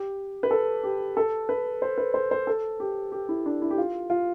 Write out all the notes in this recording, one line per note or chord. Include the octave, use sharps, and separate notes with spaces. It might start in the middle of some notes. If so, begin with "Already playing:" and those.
Already playing: G4
B4
A4
G4
A4
B4
C5
B4
C5
C5
A4
G4
G4
E4
D4
E4
G4
F4
F4